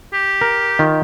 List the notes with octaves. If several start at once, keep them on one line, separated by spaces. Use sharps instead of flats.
G4
A#4
D#3 F4